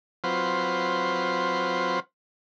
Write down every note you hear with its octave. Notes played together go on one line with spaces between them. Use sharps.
F#3 C4 F4 B4 C5